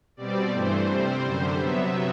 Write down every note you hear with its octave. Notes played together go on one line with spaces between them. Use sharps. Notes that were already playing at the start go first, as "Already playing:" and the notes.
B2 G3 C4 D5
G2 E3 A3 C5
C3 G3 C4
F#2 D3 G3
C3 F#3 B3 E5